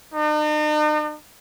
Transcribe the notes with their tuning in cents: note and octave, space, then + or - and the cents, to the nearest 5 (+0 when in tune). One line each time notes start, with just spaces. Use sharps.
D#4 -45